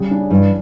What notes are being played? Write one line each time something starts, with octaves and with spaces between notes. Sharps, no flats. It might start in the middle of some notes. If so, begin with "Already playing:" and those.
Already playing: C#3 G3
D4
G2 E3